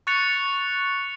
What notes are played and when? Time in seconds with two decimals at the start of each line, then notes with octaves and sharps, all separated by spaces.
0.07 C#6 F#6 A6 C#7 F7